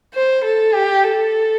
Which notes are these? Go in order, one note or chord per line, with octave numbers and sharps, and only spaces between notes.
C5
A4
G4
A4